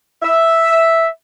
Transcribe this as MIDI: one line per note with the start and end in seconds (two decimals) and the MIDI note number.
0.23 1.07 76